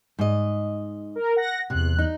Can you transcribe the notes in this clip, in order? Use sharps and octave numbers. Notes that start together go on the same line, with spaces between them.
G#2 D#5
A#4
F#5 A#6
E2 C3 F#6
D#4